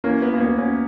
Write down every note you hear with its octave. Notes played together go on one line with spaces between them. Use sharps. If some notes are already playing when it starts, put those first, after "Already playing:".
E3 A#3 C#4
B3
A#3
D2 B3
A#3 C#4